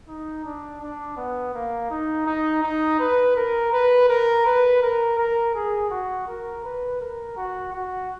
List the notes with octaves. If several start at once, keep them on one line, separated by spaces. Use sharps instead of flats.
D#4
D4
D4
B3
A#3
D#4
D#4
D#4
B4
A#4
B4
A#4
B4
A#4
A#4
G#4
F#4
A#4
B4
A#4
F#4
F#4